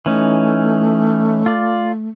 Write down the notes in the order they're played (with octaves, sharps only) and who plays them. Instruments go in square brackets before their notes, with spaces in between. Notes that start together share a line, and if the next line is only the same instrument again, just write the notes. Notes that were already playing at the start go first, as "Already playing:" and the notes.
[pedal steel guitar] E3 C#4 D#4 [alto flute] A3
[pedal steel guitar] F4 D5